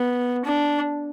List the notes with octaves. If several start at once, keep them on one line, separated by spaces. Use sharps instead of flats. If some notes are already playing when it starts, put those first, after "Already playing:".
Already playing: B3
D4